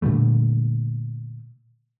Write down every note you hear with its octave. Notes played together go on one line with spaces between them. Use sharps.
A#2 D3 G3 A3